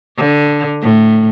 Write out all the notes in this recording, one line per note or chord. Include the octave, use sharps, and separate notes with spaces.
D3
A2